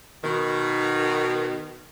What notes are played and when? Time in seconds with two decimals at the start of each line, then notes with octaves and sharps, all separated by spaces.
0.24 B2 D#3